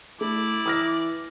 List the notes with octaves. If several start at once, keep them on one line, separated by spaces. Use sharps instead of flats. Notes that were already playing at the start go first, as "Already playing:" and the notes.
A3 E4 D5
E3 D#6 F6 A#6